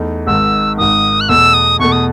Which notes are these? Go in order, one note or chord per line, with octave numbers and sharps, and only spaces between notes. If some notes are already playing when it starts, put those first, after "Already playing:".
Already playing: E2 A3 D#4
G#1 G#2 D#3 E6
G#1 G#2 D#3 D#6
F#6
E2 B2 A3 E6
D#6
E2 B2 A3 C#6
D#6